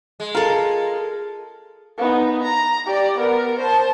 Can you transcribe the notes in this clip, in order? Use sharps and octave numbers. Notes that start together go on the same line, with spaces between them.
G#3
F4 A4 A#4 A5
B3 D#4
A#5
G4 D5
B3 A#4
C5 A5